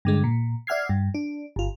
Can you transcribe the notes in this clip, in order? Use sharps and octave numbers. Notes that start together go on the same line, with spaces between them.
G2 D3 G#3
A#2
D5 E5 F#5 F6 G#6 C7
G2
D4
G1 F4